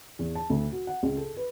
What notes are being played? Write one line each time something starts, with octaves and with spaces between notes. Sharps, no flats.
E2
A5
D2
F#4
F#5
C#2
A4
B4